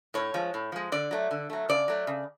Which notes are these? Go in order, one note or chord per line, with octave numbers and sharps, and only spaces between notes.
A2 C#5
F3 G#3
A2
F3 G#3
D3 D5
F#3 A3
D3
F#3 A3
C#3 D5
F#3 A3
C#3